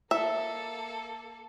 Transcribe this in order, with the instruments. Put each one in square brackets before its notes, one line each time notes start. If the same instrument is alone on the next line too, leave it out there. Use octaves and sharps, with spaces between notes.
[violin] A#3 A4 [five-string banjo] E5